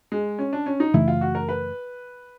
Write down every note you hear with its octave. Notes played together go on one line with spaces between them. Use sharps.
G#3
C#4
D4
C#4
D#4
F#2 C#3 E3 A3 E4
F4
F#4
A#4
B4